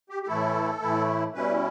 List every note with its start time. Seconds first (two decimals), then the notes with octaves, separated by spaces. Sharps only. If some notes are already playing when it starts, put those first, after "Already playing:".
0.10 G4
0.23 G4
0.27 A2 E3 A3 E4 A4
0.81 A2 E3 A3 E4
1.34 B2 G3 C#4 E4 B4